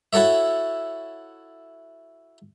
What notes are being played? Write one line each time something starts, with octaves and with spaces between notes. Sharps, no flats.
E4 F#4 A4 C#5 E5